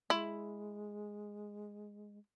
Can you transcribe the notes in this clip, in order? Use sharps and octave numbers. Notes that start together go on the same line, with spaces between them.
G#3 E4